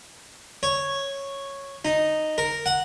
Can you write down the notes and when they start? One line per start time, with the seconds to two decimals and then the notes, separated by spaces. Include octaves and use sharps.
0.63 C#5
1.85 D#4
2.38 A#4
2.66 F#5